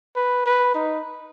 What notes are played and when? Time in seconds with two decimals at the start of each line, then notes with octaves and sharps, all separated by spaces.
0.16 B4
0.46 B4
0.75 D#4